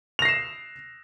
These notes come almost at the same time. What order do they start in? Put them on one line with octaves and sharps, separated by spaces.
F7 A#6 C7 E7